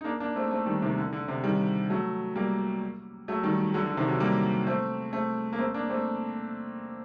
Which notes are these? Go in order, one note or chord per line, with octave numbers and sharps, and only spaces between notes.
D#4
A#3 D4
A#3 D4
A3 C4
A3 C4
D#3 G3
C3 D#3
D3
D3
C3
D#3 G3
F#3 A3
G3 A#3
F#3 A3
D#3 G3
D3 F#3
D3
C3 D#3
D3 F#3
G3 A#3
A3 C4
A3 C4
A#3
A3 C4
A#3 D4
A3 C4